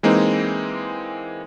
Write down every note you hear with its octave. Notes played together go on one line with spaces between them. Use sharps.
E3 G#3 A#3 C4 D#4